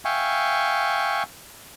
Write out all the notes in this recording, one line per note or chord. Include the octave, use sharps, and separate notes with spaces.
E5 F5 G5 G#5 C#6